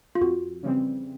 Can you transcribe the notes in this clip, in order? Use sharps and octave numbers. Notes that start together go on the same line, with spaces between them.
F4
F2 F#4
C#3 E3 G3 C4